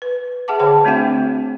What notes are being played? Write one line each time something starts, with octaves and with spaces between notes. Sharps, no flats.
B4
G#4 E5 F#5 A5 D6
D3 G#4 C5 C#5 G5 A5
A3 C4 D4 F#4 E5 G5